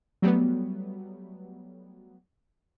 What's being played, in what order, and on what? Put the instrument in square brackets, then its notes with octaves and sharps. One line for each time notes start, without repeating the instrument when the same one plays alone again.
[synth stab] F#3 G3 A3 B3